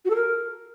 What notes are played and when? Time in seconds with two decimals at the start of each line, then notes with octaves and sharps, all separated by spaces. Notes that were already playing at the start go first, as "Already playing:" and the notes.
0.05 F#4
0.10 A4
0.15 A#4